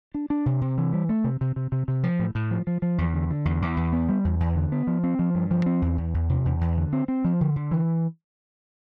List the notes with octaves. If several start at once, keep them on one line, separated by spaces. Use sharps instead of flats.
D4
D4
C3
C3
E3
G3
A3
C3
C3
C3
C3
C3
F3
A2
A2
F3
F3
F3
E2
D3
D3
E2
E2
E2
B3
G3
E2
E2
D3
B3
F3
C4
F3
G2
F3
C4
E2
E2
E2
C3
E2
E2
D3
C4
C4
F3
D3
D3
E3